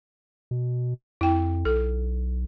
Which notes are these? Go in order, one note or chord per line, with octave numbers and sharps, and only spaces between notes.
B2
F2 E4 G5
B1 A4